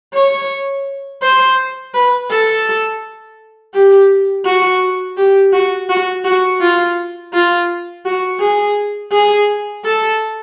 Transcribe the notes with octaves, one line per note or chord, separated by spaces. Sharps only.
C#5
C5
B4
A4
G4
F#4
G4
F#4
F#4
F#4
F4
F4
F#4
G#4
G#4
A4